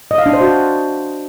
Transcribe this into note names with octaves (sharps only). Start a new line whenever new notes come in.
D#5
F5
D4
C5
F#4